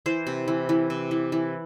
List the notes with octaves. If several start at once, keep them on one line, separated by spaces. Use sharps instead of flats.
E3 C5
C3
E3
E3
C3
E3
E3